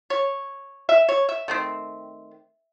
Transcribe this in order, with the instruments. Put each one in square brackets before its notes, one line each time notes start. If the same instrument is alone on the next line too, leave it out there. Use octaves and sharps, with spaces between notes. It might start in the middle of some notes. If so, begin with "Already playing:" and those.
[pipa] C#5
E5
C#5
E5
D#3 A3 C4